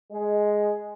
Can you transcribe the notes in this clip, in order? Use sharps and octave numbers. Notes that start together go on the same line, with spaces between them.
G#3